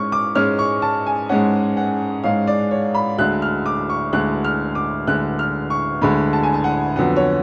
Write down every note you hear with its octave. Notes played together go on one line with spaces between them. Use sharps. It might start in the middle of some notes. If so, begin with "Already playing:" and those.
Already playing: G#2 G#3 C#4 C#6 F6
D6
G#2 G#3 C#4 F6
C#6
A5
G#5
G#2 G#3 C#4 F#5
F#5
G#2 G#3 C#4 F5
D5
C#5
B5
D2 D3 G#3 F#6
F6
D6
C#6
D2 D3 G#3 F#6
F6
D6
D2 D3 G#3 F#6
F6
C#6
D2 D3 G#3 B5
A5
G#5
A5
F#5
F2 D3 F#3 B3 F#5
C#5